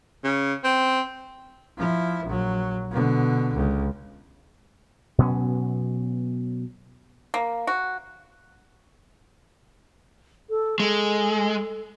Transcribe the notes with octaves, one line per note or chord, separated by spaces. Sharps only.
C#3
C4
F3 E4
A#1 F#3
B2 D3
C#2
B2 F#3 B3 C#4
A#3
F#4
A4
G#3 A4